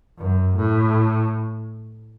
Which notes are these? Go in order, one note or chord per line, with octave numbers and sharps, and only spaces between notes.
F#2
A2